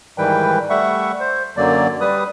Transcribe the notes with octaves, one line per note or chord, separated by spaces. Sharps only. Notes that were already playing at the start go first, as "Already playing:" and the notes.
G#2 D#3 E3 G3 B4 G5
G3 A3 E5 F#5 C#6
C5
F#2 D3 F#3 A#3 D5
G3 B4 D#6